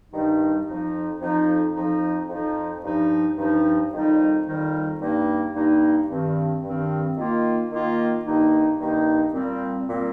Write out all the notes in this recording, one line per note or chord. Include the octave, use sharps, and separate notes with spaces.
G2 D#3 G3 D#4
F2 F3 D#4
F2 F3 D#4
F2 F3 D#4
F2 F3 D#4
G2 F3 D#4
G2 F3 D#4
F2 D#3 G3 D#4
F2 D#3 G3 D#4
G2 G3 A#3 D#4
G2 G3 A#3 D#4
G2 D#3 C4
G2 D#3 C4
D#3 A#3 F4
D#3 A#3 F4
G2 D#3 A#3 D#4
G2 D#3 A#3 D#4
A#2 G3 C4
A#2 G3 C4